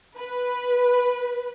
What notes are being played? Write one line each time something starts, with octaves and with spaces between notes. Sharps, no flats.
B4